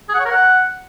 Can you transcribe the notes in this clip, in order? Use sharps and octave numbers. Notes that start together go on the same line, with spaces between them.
G#4
F#5
C#5
A#4
F#5